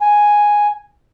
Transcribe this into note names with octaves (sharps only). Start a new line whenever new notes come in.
G#5